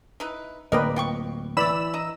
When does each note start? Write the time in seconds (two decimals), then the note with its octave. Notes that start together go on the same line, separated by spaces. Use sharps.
0.20 D#4 E4 B4
0.72 D1 A#3 A#4 B4 D5 D#5 G5
0.96 F4 G5 C#6
1.57 E3 D5 B5 E6 E7
1.94 D#5 A#5